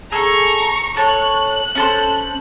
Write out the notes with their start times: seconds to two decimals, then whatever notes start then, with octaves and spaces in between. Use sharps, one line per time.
0.12 G#4 A4 A#5 C#6
0.97 A4 C#5 F#6
1.75 C#4 A4 C5